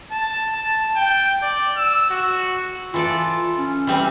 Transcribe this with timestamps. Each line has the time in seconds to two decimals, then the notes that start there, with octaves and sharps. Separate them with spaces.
0.11 A5
0.55 A5
0.96 G5
1.42 D5
1.77 E6
2.10 F#4
2.94 E3 F4 A4 D5
3.58 C#4
3.87 E3 G3 C4